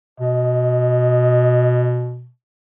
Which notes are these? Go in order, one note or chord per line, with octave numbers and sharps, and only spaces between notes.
B2 D#5